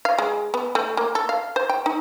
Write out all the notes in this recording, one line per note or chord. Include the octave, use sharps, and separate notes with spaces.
F5
G#3
B3
A3
A#3
A4
F5
C5
G5
D#4